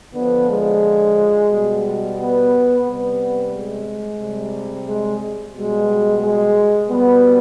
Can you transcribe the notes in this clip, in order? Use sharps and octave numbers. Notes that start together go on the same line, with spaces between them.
D3 F3 B3
G#3
B2 G3
B3
C3 G3 B3
G#3
C3 G3
G#3
B2 G3 G#3
G#3
B2 G3 B3